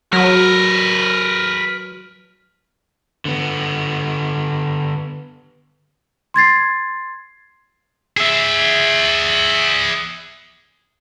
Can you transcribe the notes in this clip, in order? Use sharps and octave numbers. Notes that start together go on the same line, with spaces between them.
F#3 A#4 B4
D3 B3
C6 G#6 A6 C7
G#4 E5